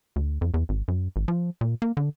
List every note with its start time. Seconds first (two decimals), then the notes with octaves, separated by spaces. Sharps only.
0.16 D2
0.41 F2
0.54 E2
0.69 G#1
0.88 F#2
1.16 G#1
1.28 F3
1.61 A#2
1.82 A#3
1.97 D3